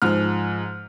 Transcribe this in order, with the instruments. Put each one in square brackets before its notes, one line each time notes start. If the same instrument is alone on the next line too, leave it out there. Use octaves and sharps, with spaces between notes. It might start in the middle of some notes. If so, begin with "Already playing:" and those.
[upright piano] G#2 F3 F6